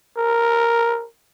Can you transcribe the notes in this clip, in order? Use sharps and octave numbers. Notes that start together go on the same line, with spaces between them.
A#4